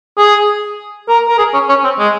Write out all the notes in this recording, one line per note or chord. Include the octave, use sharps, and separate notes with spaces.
G#4
A#4
A#4
G#4
C#4
C#4
C4
G#3